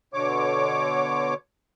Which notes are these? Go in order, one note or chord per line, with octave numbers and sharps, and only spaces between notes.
B2 D3 C#5 D6